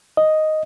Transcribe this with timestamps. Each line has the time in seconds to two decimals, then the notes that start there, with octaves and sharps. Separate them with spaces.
0.17 D#5